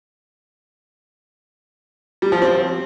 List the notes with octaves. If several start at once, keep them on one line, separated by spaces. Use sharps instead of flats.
G3
F3
C4